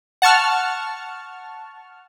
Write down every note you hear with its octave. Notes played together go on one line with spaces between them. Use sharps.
F#5 A5 C#6 F6